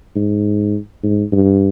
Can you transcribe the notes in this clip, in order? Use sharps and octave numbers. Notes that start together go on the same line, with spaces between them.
G#2
G#2
G2